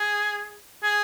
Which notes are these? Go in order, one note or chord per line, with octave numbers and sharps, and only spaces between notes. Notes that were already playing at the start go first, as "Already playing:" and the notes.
Already playing: G#4
G#4